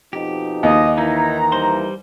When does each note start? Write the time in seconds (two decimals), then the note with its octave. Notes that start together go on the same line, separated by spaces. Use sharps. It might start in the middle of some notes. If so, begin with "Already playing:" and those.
0.13 F2 B2 D#4 G4
0.63 D#2 D#5
0.97 D#3 E3 D#4 E4 A#5
1.52 G3 C5 C6